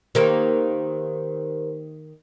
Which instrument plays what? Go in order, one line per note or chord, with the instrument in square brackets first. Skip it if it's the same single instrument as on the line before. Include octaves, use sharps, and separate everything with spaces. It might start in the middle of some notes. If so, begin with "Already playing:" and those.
[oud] D#3 A#3 [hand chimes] G4 A#4 C5